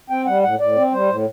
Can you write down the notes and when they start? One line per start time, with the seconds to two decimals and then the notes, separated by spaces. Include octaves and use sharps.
0.10 C4 G5
0.27 G3 F#5
0.43 A2 F#5
0.60 A2 D5
0.76 C4
0.93 G3 C5
1.09 A2